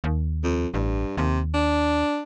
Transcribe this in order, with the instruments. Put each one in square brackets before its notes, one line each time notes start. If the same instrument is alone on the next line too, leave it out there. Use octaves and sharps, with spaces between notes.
[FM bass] D#2
[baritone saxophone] F2
[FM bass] A1 [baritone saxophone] G2
[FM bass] D#2 [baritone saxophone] C3
[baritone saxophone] D4